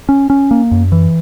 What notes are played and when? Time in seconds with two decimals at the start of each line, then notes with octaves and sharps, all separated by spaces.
0.09 C#4
0.30 C#4
0.51 A#3
0.71 F#2
0.92 E3